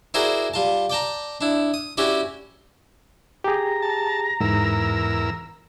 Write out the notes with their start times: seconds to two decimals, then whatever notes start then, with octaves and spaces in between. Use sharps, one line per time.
0.14 E4 F#4 G#4 A#4 C5 D5
0.54 G3 F4 A5
0.90 D5 G5 A5 A#5
1.41 D4 E4
1.74 D#6
1.97 C#4 E4 F#4 G4 D5
3.44 G4 G#4 A#5
3.82 A5
4.40 E2 G#2 A#4 E6